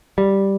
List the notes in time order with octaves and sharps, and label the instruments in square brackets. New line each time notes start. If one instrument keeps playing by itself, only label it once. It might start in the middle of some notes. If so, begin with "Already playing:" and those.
[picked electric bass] G3